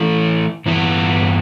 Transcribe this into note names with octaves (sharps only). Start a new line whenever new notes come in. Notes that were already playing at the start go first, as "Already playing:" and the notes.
Already playing: E3 A3 E4
G2 E3 B3 E4